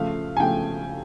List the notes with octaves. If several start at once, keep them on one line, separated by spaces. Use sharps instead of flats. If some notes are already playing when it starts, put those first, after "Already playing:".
Already playing: C#3 F3 A3 F5
G#5
C#3 F3 A3 G5